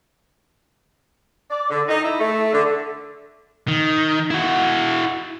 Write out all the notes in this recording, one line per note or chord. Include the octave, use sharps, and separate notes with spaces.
D5
D3
D#4
E4
A3
D3
D#3
E4 F#4